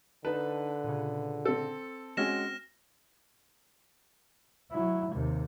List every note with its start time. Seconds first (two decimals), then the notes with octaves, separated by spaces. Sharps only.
0.25 D3 D#4 B4 A5
0.84 A#2 C#3
1.45 C4 A4
2.17 G#3 C4 C#4 F#4 F6 A#6 E7
4.71 F#3 E4
5.10 D#2 C3